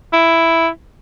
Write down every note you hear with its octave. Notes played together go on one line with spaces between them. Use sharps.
E4